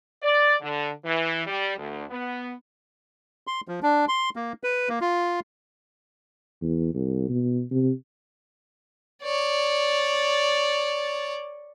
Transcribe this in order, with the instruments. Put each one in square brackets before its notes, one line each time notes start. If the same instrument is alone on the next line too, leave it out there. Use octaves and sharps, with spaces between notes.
[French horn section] D5
D3
E3
G3
D2
B3
[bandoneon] C6
F3
D4
C6
A#3
B4
A#3
F4
[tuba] E2
C2
B2
C3
[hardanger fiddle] C#5 D5